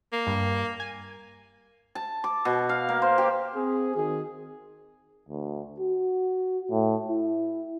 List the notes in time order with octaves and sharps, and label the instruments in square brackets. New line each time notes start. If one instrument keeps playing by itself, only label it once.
[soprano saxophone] A#3
[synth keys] G2
G#5
[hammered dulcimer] A5
D6
B2
F5
A#3
C5
G4
[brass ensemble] C4 G#4
D#3 F#4 G#4
[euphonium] D2
F#4
A2
E4